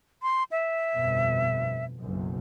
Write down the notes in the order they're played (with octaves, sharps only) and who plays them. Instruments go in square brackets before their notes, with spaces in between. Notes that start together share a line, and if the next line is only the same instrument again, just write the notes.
[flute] C6
E5
[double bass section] G1 F2 B2
F#1 B1 F#2